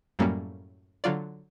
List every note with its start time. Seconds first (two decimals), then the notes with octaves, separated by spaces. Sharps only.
0.19 F#2 A2 F#3 G3 A#3 C#4
1.04 D3 F#3 F4 D5